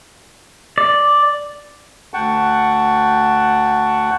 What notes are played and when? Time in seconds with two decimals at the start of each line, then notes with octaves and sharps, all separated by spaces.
0.78 D5
2.14 D2 F#5 G5 A5 C#6